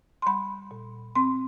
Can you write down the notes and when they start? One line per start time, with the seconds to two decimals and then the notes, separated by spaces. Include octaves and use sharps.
0.22 C6
0.26 G3 B5
0.71 A#2
1.15 C4 C6